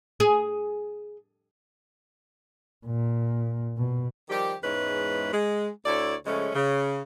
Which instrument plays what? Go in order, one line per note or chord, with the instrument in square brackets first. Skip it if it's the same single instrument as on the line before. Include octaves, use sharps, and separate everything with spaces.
[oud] G#4
[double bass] A#2
B2
[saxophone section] D#3 F3 G3 G4
E2 G#2 G#3 C#4 E4 B4
G#3
D2 E4 A4 C#5 D5
C#3 F3 G#3 A3 C#4
C#3